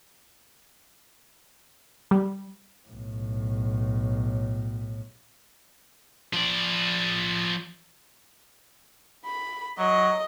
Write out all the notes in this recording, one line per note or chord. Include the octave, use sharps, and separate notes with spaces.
G3
B1 A2
F3 D5
B5
F#3 D#5